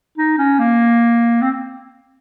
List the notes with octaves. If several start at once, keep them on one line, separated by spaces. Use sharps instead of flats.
D#4
C#4
A#3
C4